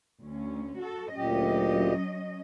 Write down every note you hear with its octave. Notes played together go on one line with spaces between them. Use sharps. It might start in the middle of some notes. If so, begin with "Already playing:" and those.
D2 C#4
F#4 A4
D2 A#2 F#3 C#4 G4 D#5